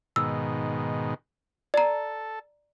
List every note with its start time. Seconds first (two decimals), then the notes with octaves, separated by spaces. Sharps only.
0.16 G#2 B2 D#3 E6
1.74 A4 D5 A#5